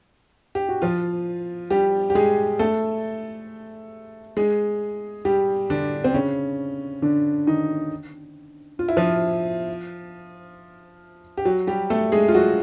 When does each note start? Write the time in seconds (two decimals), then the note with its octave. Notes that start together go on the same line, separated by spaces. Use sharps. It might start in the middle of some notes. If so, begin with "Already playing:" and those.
0.55 G4
0.69 F#4
0.82 F3 F4
1.70 G3 G4
2.10 G4
2.15 G#3 G#4
2.59 A3 A4
4.37 G#3 G#4
5.25 G3 G4
5.70 D3 D4
6.04 C4
6.14 C#3 C#4
7.02 D3 D4
7.47 D#3 D#4
8.79 F4
8.89 E4
8.97 F3 F4
11.37 G4
11.45 F#3 F#4
11.67 G3 G4
11.90 A3 A4
12.12 G#3 G#4
12.28 F4
12.34 F#3 F#4